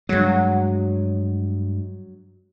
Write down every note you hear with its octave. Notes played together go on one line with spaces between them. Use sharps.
G2 F#3 G#3